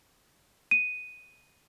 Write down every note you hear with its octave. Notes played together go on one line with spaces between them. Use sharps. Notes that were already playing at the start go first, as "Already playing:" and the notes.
D#7